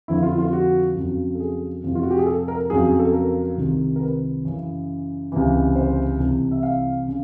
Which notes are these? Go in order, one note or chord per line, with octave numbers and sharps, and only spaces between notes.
F2 D3 F3 E4
F4
F4
F#4
F2 C#3 F#3
A4
G#4
F2 C3 F3
F4
F#4
G4
G#4
A4
A#4
F2 C#3 F#3 G#4
G#4
A4
A#4
C2 C3 D#3
A#4
B4
F#2 C#3 E3
C#2 C3 E3
C5
C2 C3 E3
E5
F5
C#3